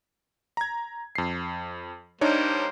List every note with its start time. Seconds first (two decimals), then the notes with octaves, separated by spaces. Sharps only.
0.57 A#5 G#6
1.15 F2 C7
2.21 G3 A#3 D4 D#4 C5 C#5